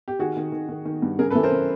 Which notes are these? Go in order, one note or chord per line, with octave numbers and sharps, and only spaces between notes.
G4
D#3 F#4 G#4
D#3
D#3
D#3
D#3
G2
C#3 G#4 A#4
A4 B4
E3
A#4 C5
C#3